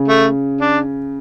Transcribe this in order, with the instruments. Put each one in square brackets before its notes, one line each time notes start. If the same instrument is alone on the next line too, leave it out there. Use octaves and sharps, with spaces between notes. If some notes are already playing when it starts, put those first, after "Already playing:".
Already playing: [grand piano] C#3
[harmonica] A3
D4